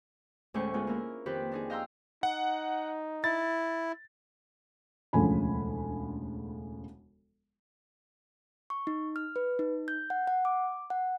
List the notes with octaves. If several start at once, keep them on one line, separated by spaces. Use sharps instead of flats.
D2 A2 G#3 C#4 C5 C#6
G#3 B3 F4 G#4
A#3 C#4 E4 A#4
F2 D#3 C4 G4 B4
D4 D#4 G#4
D#5 F5 G5 A#5 C6 E6
D#4 F#5
E4 A6
E1 D2 C#3 F3 G#5 B5
C#6
D#4
F6
B4
D#4
G6
F#5
F#5
D6
F#5